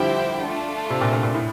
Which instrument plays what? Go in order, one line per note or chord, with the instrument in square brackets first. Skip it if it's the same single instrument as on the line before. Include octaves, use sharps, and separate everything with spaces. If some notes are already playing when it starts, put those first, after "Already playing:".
Already playing: [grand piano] D3 F3 G3 [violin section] E4 G4 C5 E5 G5
[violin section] A3 D4 F4 A4
[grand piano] C3
A#2
A#2
A#2
A2